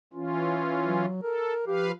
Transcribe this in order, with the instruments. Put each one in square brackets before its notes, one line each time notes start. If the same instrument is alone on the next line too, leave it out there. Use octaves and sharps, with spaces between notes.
[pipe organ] E3 C#4 F4
[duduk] F#3
[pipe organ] A4 [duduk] A#4
[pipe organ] F3 B4 F5 [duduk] G4